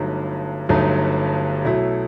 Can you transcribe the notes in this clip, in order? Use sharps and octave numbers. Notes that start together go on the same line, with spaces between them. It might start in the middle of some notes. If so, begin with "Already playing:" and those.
Already playing: G1 G2 F#3 A3 D#4
G1 G2 F#3 A3 D#4
B1 B2 F#3 A3 E4